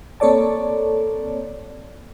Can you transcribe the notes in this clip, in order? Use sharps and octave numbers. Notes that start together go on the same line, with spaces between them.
A#3 C4 A4 C#5 D5 A5